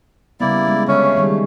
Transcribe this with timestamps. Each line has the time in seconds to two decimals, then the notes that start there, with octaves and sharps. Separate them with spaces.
0.40 C#3 G3 A#3 B3 E4 D5
0.68 G#3
0.88 D3 A3 C#4 E5 F5
1.16 D#3 G3 G#3